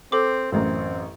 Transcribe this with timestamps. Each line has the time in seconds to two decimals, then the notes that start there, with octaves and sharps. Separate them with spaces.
0.12 C4 A4 D6
0.52 A1 F#2 C4